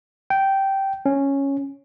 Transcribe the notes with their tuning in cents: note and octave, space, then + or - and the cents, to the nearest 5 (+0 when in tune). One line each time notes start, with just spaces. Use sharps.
G5 -10
C#4 -5